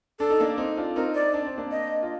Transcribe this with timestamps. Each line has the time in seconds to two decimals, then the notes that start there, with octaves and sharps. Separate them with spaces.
0.19 D4 A4
0.30 D#4
0.40 A#3 D4
0.58 C4 D#4
0.77 D4 F4
0.96 C4 D#4 A#4
1.15 D5
1.34 D4
1.46 C4
1.58 A#3 D4
1.71 D#5
2.03 F4